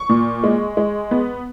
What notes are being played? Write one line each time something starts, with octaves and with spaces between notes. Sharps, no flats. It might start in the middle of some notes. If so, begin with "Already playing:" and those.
Already playing: C#6
A#2
G#3
G#3
B3